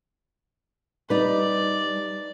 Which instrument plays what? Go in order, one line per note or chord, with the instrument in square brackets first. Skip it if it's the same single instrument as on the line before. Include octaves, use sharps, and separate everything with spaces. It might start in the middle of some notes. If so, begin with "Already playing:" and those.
[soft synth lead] G3 [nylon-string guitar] D#4 B4 [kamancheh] D5